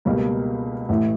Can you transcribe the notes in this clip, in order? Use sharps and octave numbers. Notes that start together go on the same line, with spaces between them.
C#2 B2 G3 A#3 F5
A1 A2 E3 A3 E5